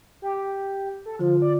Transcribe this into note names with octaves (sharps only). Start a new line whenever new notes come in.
G4
A4
D3 F3 F4
D5